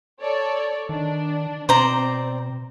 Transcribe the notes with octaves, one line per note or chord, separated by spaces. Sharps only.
A4 C#5 D5
D#3 D4
B2 C4 C5 D5 A#5